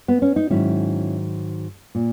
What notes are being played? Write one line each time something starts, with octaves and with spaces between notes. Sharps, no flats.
B3
C#4
D#4
G#2 D#3 F#3 C#4 E4
A#2